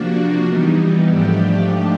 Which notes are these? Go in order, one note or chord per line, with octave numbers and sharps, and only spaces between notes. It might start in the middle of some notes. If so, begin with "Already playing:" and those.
Already playing: C3 F3 A#3 D4 F#4
E3 G3 B3 D#4
G#2 F3 A3 D4 G4